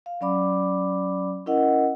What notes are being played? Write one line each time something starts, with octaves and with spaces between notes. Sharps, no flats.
F5
F#3 C#4 D5 B5 D6
C#4 E4 A#4 D#5 F#5